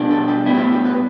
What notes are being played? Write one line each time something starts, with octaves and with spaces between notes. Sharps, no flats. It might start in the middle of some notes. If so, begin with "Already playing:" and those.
Already playing: B2 G3 D4
A4
G4
A2 G3 B3 E4
G4
E4
G4
B4